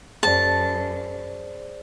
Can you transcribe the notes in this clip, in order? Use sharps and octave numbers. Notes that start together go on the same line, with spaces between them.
F#2 G#4 C5 D5 A5